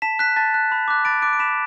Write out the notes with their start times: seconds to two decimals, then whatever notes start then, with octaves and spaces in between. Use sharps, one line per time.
0.02 A5 B6 E7
0.19 F#6 B6
0.36 A5 A6
0.54 F#6
0.72 B5
0.88 D6 F#6
1.05 B5 A6 D7
1.22 D6 F#6 A6 D7
1.33 D7
1.39 B5 B6 E7